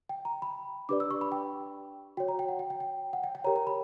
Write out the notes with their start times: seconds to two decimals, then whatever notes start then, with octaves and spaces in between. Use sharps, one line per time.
0.09 G5
0.25 A#5
0.42 B5
0.89 D4 G4 B4 D5 D6
1.00 E6
1.11 C#6
1.21 B5
1.32 G5
2.17 F#4 C#5 G5
2.28 A#5
2.39 G5
2.49 F#5
2.59 G5
2.70 G5
2.80 G5
3.13 F#5
3.24 G5
3.35 G5
3.44 G4 A#4 C#5 A#5
3.56 A#5
3.67 B5